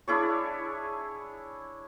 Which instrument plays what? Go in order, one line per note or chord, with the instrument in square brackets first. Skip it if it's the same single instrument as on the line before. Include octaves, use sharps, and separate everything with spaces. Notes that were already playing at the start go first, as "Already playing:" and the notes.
[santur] D4 E4 G#4 C#5